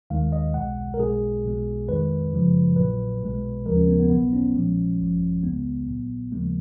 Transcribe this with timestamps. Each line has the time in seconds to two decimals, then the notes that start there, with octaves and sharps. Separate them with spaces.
0.10 D#2 D#3 G#3 F5
0.32 D#5
0.54 B1 B2 G#3 F#5
0.94 A#4
0.99 B1 B2 G#3 G#4
1.44 B1 B2 G#3
1.88 F2 D#3 G#3 B4
2.33 F#2 C#3 F3 G#3
2.76 A#1 A#2 F#3 B4
3.22 B1 B2 G#3
3.65 D#2 C#3 F3 G#3 A#4
3.76 C#4
3.88 B3
3.99 B3
4.10 B1 B2 F#3 B3
4.33 C#4
4.54 A#1 A#2 F3 G#3
4.99 G#1 F#2 F3 G#3
5.43 C#2 C#3 G#3 B3
5.88 A#1 A#2 F#3
6.32 D#2 C#3 F3 G#3 A#3